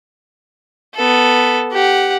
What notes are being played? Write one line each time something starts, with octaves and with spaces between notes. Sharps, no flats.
B3 A4
G4 F#5